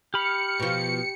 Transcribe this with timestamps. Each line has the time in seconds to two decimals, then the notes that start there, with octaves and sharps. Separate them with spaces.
0.14 G4 B5 F6 C#7
0.59 B2 F3